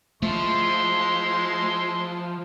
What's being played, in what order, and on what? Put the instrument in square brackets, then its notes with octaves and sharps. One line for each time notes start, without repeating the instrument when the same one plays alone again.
[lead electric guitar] F3 [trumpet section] G#3 E4 C6 [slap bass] A3